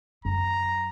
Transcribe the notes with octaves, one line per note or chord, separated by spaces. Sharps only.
F#2 A#5